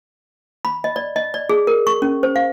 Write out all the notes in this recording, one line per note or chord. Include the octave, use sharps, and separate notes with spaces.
B5
D#5
D5
D#5
D5
G#4
A#4
C#6
C#4
C5
F5